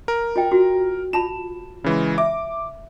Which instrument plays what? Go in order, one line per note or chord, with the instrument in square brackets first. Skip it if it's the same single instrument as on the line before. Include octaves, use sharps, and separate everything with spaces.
[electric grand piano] A#4
[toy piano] F4 D#5 G5
F4 F#4
[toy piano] F4 A5 B5 [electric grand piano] E7
[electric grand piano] C#3 E3 G#3
[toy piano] E5 [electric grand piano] D6